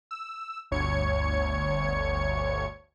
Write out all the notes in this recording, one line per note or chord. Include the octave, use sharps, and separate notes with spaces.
E6
G1 D2 C#5 G#6 C#7